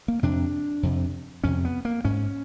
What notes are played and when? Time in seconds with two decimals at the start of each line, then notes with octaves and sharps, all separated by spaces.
0.08 A#3
0.23 F2 C3 D4
0.83 F2 C3
1.44 F2 C3 C#4
1.65 B3
1.85 A#3
2.05 G#2 C#4